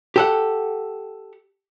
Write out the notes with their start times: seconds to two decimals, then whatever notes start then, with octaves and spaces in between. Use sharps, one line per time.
0.16 G4 A4 F#5